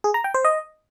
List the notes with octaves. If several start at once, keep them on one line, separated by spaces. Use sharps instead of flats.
G#4
A#5
G5
C5
D#5